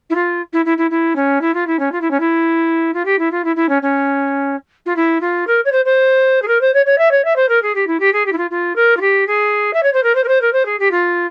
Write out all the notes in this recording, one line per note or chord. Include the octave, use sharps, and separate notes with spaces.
E4
F4
E4
E4
E4
E4
C#4
E4
F4
E4
C#4
F4
E4
C#4
E4
F4
G4
E4
F4
E4
E4
C#4
C#4
F4
E4
F4
A#4
C#5
C5
C5
G#4
A#4
C5
C#5
C#5
E5
C#5
E5
C5
A#4
G#4
G4
E4
G4
G#4
G4
E4
F4
F4
A#4
F4
G4
G#4
E5
C#5
C5
A#4
C5
A#4
C5
A#4
C5
G#4
G4
F4